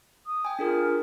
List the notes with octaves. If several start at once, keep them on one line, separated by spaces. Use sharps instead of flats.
D#6
G5 G#5
D4 F4 G#4 A#4